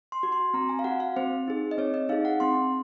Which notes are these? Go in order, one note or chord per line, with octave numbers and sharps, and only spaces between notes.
C6
F#4
C6
C4 A#5
G#5
F5
F#4 F#5
F5
C4 C5
D#4 G#4
D#5
C4 C#5
D#5
D#4 G#4 F5
F#5
C4 C6